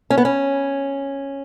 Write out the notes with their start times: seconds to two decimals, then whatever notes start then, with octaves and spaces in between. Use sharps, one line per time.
0.10 C#4
0.18 B3
0.25 C#4